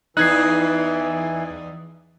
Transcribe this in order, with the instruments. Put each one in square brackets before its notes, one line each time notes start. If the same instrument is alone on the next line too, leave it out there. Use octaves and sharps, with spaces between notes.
[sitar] E2 D#4 [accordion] E3 [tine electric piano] F#6 G#6 C7